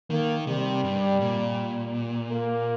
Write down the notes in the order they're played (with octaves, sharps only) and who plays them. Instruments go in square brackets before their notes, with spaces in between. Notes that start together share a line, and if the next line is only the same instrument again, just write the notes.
[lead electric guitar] D#3 [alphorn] A#3
[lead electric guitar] C3 [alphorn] G3
[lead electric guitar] G2
A#2
[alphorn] A#3